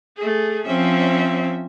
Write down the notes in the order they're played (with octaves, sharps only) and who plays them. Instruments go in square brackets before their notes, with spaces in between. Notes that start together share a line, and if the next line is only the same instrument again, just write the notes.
[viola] A3 G#4
[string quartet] F3 C4 [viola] C#4 E5